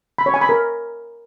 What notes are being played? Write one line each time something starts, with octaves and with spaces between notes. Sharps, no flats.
B5
C#5
G#5
B5
A#4